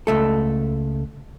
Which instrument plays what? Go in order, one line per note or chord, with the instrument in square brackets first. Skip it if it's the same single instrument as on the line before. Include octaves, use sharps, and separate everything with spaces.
[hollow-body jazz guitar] C#2 A3 A4